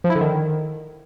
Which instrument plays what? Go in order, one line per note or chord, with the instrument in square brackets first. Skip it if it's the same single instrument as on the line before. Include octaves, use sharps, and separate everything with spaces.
[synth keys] F3
E4
D3
D#3